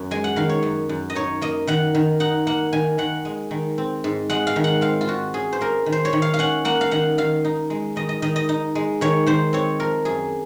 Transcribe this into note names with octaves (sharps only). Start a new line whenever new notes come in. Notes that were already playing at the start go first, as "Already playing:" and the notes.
Already playing: F#2
G#3 G#5
F#5
D#3 F5
C#5
F#2
F#2
D#5
D#4 C#5
A#3 D#5
D#3 F#5
D#3
D#4 F#5
A#3 F#5
D#3 G#5
D#3 F#5
G#3
D#3
C4
G#2
G#3 F#5
F5
D#3
F#5
C4 F5
F4
G#2 F#4
C#4 G#4
C5
A#3 A#4
D#3
C5
C#5
D#3
F5
F5
C#4 F#5
A#3 F#5
F5
D#3 F#5
D#3 F5
D#4
G#3
D#3 D#5
D#5
D#3 D#5
D#5
D#4
G#3
D#3 C#5
D#3 C5
C4 C#5
F3 A#4
F#2 G#4